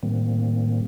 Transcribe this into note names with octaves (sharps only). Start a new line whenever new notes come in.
A2 D#3 G3 A#3 C4